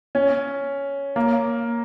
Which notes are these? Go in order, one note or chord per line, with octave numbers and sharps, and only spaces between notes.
C#4
A#3